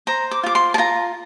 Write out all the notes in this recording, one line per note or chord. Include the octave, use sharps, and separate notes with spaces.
C5 A#5
D6
F4 D6
C6
A5
F4 A#5